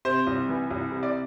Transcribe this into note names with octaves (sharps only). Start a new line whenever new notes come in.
C3 C5
C2
E3
C2
C3
D5